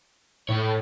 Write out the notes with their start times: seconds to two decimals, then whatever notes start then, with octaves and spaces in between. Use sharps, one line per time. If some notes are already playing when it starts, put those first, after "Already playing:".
0.49 A2 A4 C#5